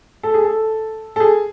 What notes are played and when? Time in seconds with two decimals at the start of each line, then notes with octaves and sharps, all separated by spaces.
0.23 A4
0.34 G#4
0.44 A4
1.16 A4
1.20 G#4